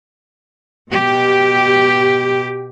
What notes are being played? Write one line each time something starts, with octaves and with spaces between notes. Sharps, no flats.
B2 G4